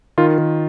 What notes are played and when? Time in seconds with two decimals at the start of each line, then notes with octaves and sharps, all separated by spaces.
0.18 D#3 F4
0.38 D#3